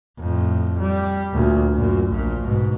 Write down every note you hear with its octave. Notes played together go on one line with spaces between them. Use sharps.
F2 A2
G3
D2 A#2
F#2 A#2
A#1 A#2
G#2 B2